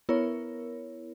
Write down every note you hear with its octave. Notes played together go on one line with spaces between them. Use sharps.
B3 E4 A#4 C#5